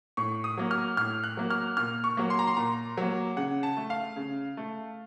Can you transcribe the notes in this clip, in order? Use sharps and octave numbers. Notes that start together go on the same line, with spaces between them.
A2 C#6
D#6
F#3 A#3
F6
A2 F6
F#6
F#3 A#3
F6
A#2 F6
C#6
F#3 A#3
C6
A#5
C6
A#2 A#5
F#3 A#3
C#3 F#5
A5
A3
F5
C#3
A3